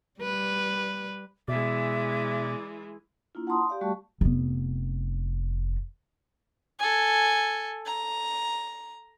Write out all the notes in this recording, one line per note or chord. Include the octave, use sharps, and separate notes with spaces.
G3 B4
B2 E3 G#3 D5 E5
A#3 D4 E4 F4
F#5 A5 A#5 C6 D#6
G4 D5 F5
G3 A3 F#4 A5 C#6
F1 B3
A4 G#5
A#5